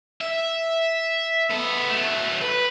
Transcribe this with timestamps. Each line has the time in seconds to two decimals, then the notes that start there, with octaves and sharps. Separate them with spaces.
0.21 E5
1.51 B3 A4
1.90 F#3 A3
2.41 B4